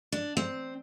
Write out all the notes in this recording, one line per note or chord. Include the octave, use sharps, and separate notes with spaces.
D4
C4